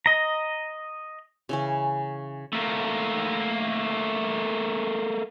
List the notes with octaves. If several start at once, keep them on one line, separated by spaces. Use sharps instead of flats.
D#5 A#5
C#3 E3 C#4
A3 A#3